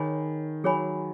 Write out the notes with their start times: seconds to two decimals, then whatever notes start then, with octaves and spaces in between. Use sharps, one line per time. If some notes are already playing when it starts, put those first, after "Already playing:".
Already playing: D#3 G#4 C#5 G#5 B5
0.64 F#3 G#4 C#5 G#5 B5